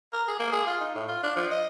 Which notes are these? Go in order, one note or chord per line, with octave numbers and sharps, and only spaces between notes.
A#4
G#4
A#3
G#4
F4
D#4
A2
F4
D4
F3
D#5